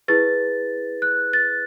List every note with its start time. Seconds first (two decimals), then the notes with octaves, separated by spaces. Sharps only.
0.08 E4 G#4 B4 A6
1.02 F#6
1.33 A6